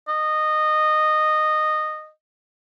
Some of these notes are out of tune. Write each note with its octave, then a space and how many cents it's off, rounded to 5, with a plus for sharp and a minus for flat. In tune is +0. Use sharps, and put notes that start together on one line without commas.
D#5 -15